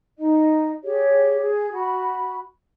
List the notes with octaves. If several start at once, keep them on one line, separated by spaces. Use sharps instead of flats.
D#4 D#5
G4 G#4 C#5
G#4
F#4 B5